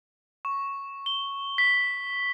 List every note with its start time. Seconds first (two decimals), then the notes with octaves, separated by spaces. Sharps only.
0.45 C#6
1.06 G7
1.58 B6